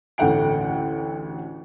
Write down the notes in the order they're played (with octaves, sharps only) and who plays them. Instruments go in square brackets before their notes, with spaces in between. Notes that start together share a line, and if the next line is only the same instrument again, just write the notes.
[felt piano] A1 D2 A3 F#5 G5 D7